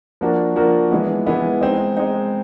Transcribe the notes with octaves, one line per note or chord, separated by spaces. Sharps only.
F3 A#3 D4 F#4 A#4
F3 A#3 D4 F#4 A#4
E3 G#3 B3
E3 G#3 B3
G#3 C4 D#4
G#3 C4 D#4